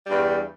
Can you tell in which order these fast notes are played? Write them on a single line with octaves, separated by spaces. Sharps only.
G3 G2 E2